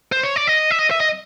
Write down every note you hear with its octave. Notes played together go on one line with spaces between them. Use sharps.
C5
C#5
D5
D#5
E5
D#5
E5
D#5